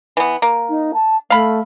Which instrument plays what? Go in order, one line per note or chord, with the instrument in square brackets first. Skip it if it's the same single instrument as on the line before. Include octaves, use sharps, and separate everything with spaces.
[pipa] E3 B3
A#3
[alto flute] D#4
A5
[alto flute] A3 [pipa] F5 B5